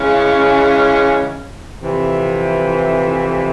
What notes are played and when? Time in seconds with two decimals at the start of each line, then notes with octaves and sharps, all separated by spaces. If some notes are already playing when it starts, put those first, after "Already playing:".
Already playing: C#3 E3 G#3 C#4
1.78 F2 C3 E3